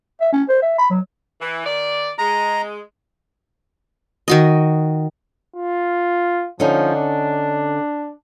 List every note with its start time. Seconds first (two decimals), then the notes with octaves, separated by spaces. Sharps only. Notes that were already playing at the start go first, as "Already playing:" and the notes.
0.21 E5
0.33 C#4
0.49 C5
0.62 E5
0.78 B5
0.90 F#3
1.40 E3
1.65 D#3 D5
2.18 G#3 A#5
4.28 D#3 F#4 D#5
5.56 F4
6.60 D3 F3 C#4 D#4
6.95 D4